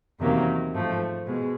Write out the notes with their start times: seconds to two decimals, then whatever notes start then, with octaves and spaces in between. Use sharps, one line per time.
0.20 E2 C3 D#3 F#3 A#3
0.74 G#2 F3 A3
1.27 B2 G#3